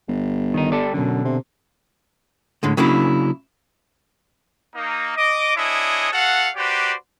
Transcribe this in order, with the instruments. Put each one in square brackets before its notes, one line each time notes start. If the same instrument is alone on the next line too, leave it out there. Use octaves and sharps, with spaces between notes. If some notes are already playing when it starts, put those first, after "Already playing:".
[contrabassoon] G1
[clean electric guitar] D#3 D#4
G3 A4 D5
[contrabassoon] F#2 [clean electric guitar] B2 D3
[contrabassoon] C3
[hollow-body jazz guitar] A2 D3 G#3
C#3 F#3 A#3 D4 E4
[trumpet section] A#3 D#4
D#5 D6
D4 E4 G#4 C#5 D#5
F#4 A4 F5 F#5
F#4 G4 B4 C5 D5